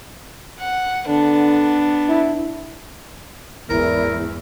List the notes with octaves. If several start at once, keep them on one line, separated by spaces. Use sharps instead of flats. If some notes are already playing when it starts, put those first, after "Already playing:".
F#5
D3 B3 D4
E4
A1 E2 G#2 E4 A#4